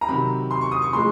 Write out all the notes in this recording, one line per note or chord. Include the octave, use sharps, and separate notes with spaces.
A#5
C3 D#3 F#3 B5
C6
C#6
D#6
C#6
A2 F3 G#3 C6